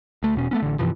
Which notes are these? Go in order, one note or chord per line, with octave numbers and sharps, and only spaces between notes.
D2 A3
E1 B2 C#4
A3 B3 C#4
A1 D3
G2 C3 E3 F3